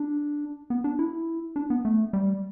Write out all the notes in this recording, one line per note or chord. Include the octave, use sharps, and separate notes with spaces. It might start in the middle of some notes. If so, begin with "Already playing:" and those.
Already playing: D4
B3
D4
E4
D4
B3
A3
G3